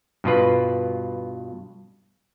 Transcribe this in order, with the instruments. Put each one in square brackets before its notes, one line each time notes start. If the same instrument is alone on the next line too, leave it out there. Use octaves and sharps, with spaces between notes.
[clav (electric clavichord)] G2 B2 F4 B4